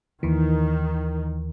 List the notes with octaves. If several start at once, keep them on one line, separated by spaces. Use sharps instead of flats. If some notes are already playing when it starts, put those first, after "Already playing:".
D#2 D#3 E3